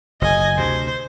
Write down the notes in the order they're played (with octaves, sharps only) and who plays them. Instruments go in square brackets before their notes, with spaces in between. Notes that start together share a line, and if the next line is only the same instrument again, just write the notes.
[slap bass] F#1 [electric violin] D#5 G#5
[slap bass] D2 C3 [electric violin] C5